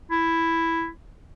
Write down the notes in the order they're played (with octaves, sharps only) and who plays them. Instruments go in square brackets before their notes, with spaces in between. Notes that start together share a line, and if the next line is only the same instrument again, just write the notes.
[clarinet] E4